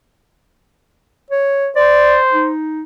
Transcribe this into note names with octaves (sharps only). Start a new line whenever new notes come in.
C#5
C5 D5
D#4